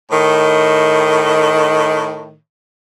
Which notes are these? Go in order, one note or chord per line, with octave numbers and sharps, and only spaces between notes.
A2 D#3